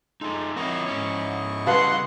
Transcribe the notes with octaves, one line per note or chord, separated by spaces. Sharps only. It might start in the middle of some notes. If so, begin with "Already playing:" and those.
G#3 A3 D#4 F4 A4
C4 E4 A#4 C#5 D#5 C#6
G#2 C#4 C#5
C#3 G3 B4 F5 F#5 A5 C6